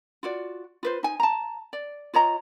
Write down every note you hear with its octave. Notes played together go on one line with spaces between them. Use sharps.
F4 F#4 D5
F4 B4 C5
D#4 G#5
A5 A#5
D5
F4 C#5 D#5 A#5